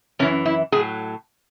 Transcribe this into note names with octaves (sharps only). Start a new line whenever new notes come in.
F#2 E3 C#4
E4
A2 F#3 G#4